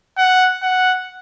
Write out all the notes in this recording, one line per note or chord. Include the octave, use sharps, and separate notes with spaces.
F#5
F#5